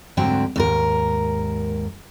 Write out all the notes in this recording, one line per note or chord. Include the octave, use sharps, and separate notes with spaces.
D2 G#2 D3 F#3 C4 G5
D#2 G#2 A#4